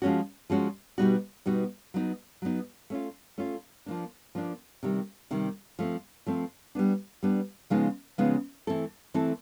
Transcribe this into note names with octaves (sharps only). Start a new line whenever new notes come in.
F3 G#3 C#4 F#4
F3 G#3 C#4 F#4
B2 G3 B3 D#4 F#4
B2 G3 B3 D#4 F#4
F#3 B3 D#4
F#3 B3 D#4
A3 C#4 F4
A3 C#4 F4
F3 A#3 D4
F3 A#3 D4
C3 D#3 G3
C3 D#3 G3
F3 A3 C4
F3 A3 C4
G3 B3 D4
G3 B3 D4
C#3 F3 G#3 B3 D#4
C#3 F3 G#3 B3 D#4
E3 A3 C4 E4 A4
E3 A3 C4 E4 A4